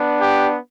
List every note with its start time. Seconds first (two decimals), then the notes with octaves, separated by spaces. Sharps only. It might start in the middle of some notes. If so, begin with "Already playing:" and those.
Already playing: B3 D4
0.20 G4